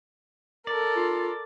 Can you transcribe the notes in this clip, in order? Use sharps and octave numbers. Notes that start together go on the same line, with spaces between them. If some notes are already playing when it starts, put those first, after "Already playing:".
A4 A#4 D5
F4